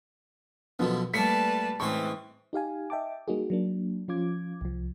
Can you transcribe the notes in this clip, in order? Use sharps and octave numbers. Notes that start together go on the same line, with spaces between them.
F#2 B2 D3 F3 B3
G3 A3 A#3 B4 D5 A5 B6 C#7
A2 E3 G#3 C4 C#4 G#4 C#6
D#4 G4 F5 G#5
D#5 E5 G5 A5 D6
G3 A#3 D#4 F#4 G#4
F#3 A#3 D4
F3 C#4 F4 D6 G#6
C2 F3